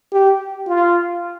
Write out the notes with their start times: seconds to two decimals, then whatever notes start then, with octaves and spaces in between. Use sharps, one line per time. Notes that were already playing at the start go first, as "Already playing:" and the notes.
0.13 G4
0.67 F4